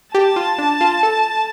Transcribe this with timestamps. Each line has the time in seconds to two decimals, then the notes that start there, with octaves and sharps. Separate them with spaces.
0.14 G4 A5
0.36 F4
0.58 D4
0.81 F4
1.03 A4